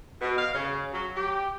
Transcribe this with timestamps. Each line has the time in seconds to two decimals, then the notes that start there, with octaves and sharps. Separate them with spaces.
0.21 B2
0.38 F5
0.55 C#3
0.93 F#3
1.17 G4